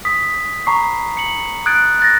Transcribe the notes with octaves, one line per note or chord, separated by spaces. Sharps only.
D#6 B6
A#5 B5 C#6 C7
C#7 F#7
D#6 F#6 G#6 A6 D7
F#6 A6 A#6